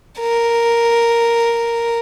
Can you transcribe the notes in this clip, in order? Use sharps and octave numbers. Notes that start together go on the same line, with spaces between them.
A#4